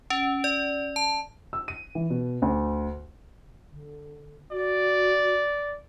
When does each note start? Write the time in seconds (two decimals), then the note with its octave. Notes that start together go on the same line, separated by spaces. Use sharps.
0.10 C#4
0.44 D5
0.96 A5
1.53 E6
1.68 D#7
1.95 E3
2.10 B2
2.42 D2
3.72 D3
4.51 F#4 D5